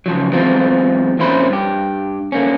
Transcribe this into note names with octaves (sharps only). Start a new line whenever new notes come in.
C#3 F3 F#3
E3 F#3 G#3 B3 C4 F4
F2 A#2 C#4 E4 C5 B5
G2 G4
D3 A#3 C#4